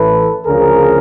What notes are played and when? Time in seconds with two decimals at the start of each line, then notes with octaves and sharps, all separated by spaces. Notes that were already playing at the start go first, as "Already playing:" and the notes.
Already playing: A1 A2 E3 A4 B4
0.45 D2 C#3 F3 G#4 A#4